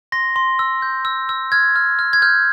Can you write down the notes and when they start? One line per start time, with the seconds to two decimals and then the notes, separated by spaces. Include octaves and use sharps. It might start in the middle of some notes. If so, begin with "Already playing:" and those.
0.12 C6 A#6
0.36 C6
0.59 E6
0.82 G6
1.05 E6
1.29 E6
1.52 F6 G#6
1.76 F6
1.99 F6
2.13 G#6
2.22 F6 G6